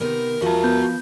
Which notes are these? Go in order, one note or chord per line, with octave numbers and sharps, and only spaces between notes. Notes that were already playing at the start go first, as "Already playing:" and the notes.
C3 D#3 B3 A#4
F3 F#4 A#4 E5 A5
B3 G6